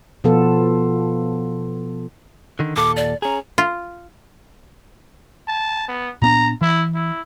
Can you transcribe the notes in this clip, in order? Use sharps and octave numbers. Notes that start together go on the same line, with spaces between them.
B2 F3 B3 F4 A4
D3 D#3
D#2 A#2 A4 D6
D5
C#4 G#4 A#5
F4
A5
B3
A#2 B3 D4 A#5
E3 E4
E4